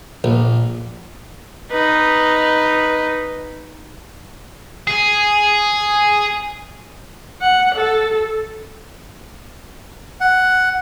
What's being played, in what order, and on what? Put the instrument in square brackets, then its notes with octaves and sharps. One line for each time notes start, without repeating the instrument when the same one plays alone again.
[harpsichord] A#1
[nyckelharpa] D#4 B4
[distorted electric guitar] G#4
[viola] F#5
A4
[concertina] F#5